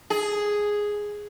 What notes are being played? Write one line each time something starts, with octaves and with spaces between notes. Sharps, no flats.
G#4